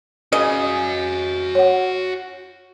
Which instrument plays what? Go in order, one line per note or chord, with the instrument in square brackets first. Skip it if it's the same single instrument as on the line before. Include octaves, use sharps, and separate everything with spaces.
[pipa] C#3 D#5 [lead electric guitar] F#4 G#5
[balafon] C#5 F#5